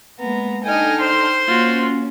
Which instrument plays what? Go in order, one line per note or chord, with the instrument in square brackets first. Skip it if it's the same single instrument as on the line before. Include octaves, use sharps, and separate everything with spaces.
[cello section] G#3 A#3 [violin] B3 [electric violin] A#5
[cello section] D4 D#4 A4 [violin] D#5 [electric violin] G5 F6 [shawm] G#5
[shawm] C5 [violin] C6
[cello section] A#3 C#4 [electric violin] F4 F#4